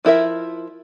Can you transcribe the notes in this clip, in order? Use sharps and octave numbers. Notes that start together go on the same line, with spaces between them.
F3 E4 A#4 E5